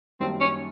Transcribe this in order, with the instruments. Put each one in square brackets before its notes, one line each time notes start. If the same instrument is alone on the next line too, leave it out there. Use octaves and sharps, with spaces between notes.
[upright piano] F#2 D#3 G3 A#3 D4 [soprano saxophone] C4
[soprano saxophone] C#4